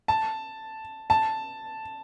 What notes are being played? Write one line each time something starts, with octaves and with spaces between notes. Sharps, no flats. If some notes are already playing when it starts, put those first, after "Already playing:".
A5
A5